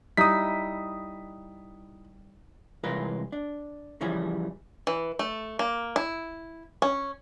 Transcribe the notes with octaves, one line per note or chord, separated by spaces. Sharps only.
G3 D#4 E4 D#6 B6
C2 E3 G#3 F4 A#4 B4
D4
C#3 E3 F3 G3 G#4
E3
A3
A#3
E4
C#4